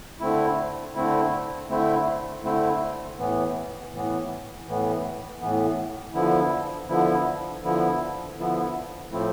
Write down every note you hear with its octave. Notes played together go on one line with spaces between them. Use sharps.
D3 A3 C4 E4
D3 A3 C4 E4
D3 A3 C4 E4
D3 A3 C4 E4
A2 E3 B3
A2 E3 B3
A2 E3 B3
A2 E3 B3
D3 F3 B3 E4
D3 F3 B3 E4
D3 F3 B3 E4
D3 F3 B3 E4
A2 F3 A3 C4 E4